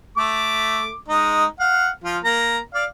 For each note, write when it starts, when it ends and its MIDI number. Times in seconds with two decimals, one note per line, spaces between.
0.17 0.91 57
0.17 0.91 86
1.08 1.45 56
1.08 1.45 63
1.60 1.89 77
1.60 1.89 78
2.04 2.18 53
2.04 2.18 65
2.24 2.58 58
2.24 2.58 82
2.74 2.85 74
2.74 2.85 77